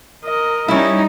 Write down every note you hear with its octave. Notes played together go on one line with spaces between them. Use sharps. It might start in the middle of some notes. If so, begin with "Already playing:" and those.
A#4 D#5
G3 C#4 D#4 E4